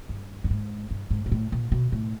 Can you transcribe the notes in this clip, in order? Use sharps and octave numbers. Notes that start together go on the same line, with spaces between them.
G2
G2
G#2
G2
G#2
A#2
A2
A#2
B2
A2